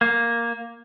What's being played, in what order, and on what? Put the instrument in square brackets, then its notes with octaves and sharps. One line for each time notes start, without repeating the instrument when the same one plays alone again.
[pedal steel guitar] A#3